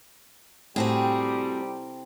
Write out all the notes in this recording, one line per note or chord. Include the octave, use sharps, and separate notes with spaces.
A2 C3 G3 C4 F#4 G#4